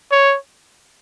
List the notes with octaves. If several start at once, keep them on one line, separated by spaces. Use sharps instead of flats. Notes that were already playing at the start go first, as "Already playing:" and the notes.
C#5